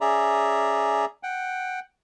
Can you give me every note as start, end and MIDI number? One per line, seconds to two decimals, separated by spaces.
0.01 1.05 61
0.01 1.05 68
0.01 1.05 74
0.01 1.05 76
0.01 1.05 82
1.23 1.80 78
1.23 1.80 79